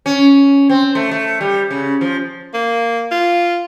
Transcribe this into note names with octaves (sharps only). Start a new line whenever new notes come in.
C#4
C4
A3
A3
G3
C#3
F3
A#3
F4